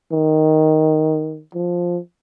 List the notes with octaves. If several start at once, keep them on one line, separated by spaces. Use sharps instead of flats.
D#3
F3